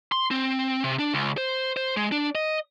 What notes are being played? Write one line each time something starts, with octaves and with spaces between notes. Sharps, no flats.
C6
C4
C3
D4
C#2
C5
C5
G#3
D4
D#5